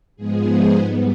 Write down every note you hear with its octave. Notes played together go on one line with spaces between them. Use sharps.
G#2 F3 G#3 B3 G#4
C5
G#2 G3 B3